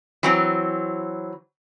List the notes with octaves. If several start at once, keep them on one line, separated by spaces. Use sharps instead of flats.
E3 F#3 C4